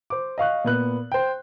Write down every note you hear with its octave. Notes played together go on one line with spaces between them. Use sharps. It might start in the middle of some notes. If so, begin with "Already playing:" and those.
C5 D6
D#5 F5 C#6 F#6
A#2 B3 F#6
C5 G5